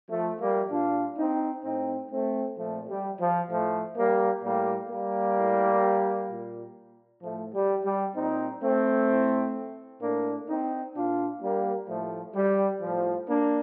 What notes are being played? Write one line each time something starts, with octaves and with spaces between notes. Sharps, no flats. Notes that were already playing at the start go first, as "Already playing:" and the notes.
F3 A3
G3 A#3
A#2 D4 F4
C4 D#4
A2 C4 D#4
A3 C4
A#2 F3 A3
G3
F3
A2 F3 A3
G3 A#3
A2 G3 A#3
G3 A#3
A2
A#2
A2 F3 A3
G3
G3
A#2 C4 D#4
A3 C4
A2
A2 A#3 D4
C4 D#4
A#2 D4 F4
G3 A#3
A2 F3 A3
G3
A2 F3
A#3 D4